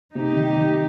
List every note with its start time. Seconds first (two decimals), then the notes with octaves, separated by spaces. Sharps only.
0.14 C3 D#4 G4
0.35 D#3
0.56 D#3